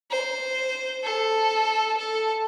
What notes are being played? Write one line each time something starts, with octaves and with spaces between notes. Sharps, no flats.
C5
A4
A4